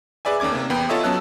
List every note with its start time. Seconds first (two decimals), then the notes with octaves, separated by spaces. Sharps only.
0.25 G#4 B4 D5 E5 G#5
0.40 D#2 A#3 C#4 D6 G#6
0.52 C3 A#3
0.70 E2 B3 G5 B5
0.89 F4 A4 C#5 D#5 E5 D#6
1.04 F#3 B3 C#4 A5 E6 F#6